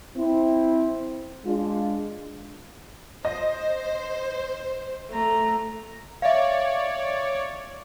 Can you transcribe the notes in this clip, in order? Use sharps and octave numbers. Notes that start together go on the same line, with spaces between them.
C4 E4
G#3 D4 F4
C5 D#5
A3 A#5
C#5 D5 E5 F5